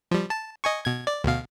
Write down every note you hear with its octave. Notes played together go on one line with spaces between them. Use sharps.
F3 G3
A5
D#5 G#5 C#6
B2 G#6
D5
D2 B2 F5